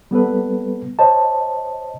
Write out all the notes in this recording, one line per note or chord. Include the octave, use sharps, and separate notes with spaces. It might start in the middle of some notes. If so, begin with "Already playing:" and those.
G3 B3 A4 B4
C5 C#5 D#5 A5